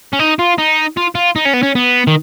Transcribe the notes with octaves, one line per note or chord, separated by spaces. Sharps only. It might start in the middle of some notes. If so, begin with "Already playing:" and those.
C#4
D#4
F4
D#4
F4
F4
D#4
C#4
B3
C#4
B3
D#3